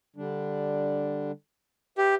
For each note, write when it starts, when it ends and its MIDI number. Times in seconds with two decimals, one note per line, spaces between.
0.16 1.32 50
0.16 1.32 55
0.16 1.32 62
1.98 2.15 67
1.98 2.16 71
1.98 2.16 76